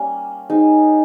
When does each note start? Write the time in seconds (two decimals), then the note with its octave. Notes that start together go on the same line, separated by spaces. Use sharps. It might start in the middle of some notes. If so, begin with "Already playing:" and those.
Already playing: G3 A#3 C#4
0.50 G#3 D#4